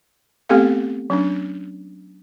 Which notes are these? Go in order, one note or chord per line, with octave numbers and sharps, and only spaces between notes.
A3 B3 C4 G4 A4 F5
F#3 C#4 D4